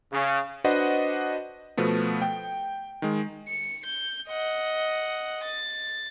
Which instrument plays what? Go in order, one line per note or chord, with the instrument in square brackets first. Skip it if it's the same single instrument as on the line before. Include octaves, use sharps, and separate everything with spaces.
[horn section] C#3
[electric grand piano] D4 F#4 B4 C5 D#5 F#5
B2 F3 A3 B3
G5
D#3 G#3
[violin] C#7
G6
D#5 F#5
A6